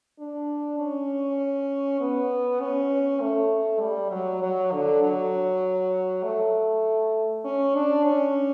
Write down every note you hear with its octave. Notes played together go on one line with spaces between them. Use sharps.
D4
C#4
B3
C#4
A3
G3
F#3
F#3
D3
F#3
A3
C#4
D4
C#4